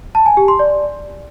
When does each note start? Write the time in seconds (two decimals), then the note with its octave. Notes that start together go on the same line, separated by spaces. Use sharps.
0.15 A5
0.26 G#5
0.37 G4
0.48 C6
0.59 D5